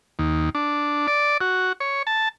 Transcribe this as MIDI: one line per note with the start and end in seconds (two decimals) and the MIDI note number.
0.19 0.50 39
0.55 1.07 62
1.07 1.37 74
1.41 1.73 66
1.80 2.03 73
2.07 2.29 81